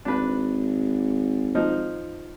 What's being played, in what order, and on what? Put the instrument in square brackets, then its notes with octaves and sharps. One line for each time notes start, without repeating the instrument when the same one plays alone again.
[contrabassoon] G#1 [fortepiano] D4 B4
[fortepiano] F3 D#4